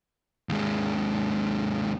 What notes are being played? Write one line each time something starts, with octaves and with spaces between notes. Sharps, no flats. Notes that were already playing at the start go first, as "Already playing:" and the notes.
D#2 G#3